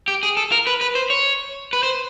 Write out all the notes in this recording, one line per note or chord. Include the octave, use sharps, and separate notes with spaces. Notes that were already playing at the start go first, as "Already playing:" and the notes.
G4
G#4
A4
A#4
B4
B4
C5
C#5
B4
C5